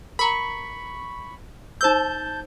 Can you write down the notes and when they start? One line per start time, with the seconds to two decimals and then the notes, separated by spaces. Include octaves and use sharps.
0.19 A#4 A#5 B5 C#6
1.81 D#4 C5 A5 E6 G6